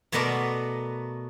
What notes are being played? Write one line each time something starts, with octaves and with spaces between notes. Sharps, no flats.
B2 A3 B3 A#4 B4 D5